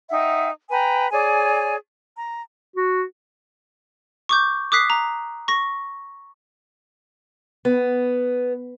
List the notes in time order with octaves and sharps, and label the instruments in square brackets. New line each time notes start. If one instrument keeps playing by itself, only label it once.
[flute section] D#4 E5 F#5 G5
B4 G5 G#5 A#5
G#4 C#5 D5 G#5
A#5
[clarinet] F#4
[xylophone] C#6 D6 G6
D6 D#6 F#6 B6 C7
A#5
C#6 A#6
[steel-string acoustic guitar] B3